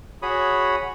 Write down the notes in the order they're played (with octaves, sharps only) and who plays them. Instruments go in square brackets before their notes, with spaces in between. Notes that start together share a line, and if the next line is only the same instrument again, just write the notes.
[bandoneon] F#4 G#4 C#5 B5 D#6